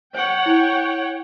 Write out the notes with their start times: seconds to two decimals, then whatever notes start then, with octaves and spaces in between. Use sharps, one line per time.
0.15 C5 C#5 F#5 G5 C#6
0.46 E4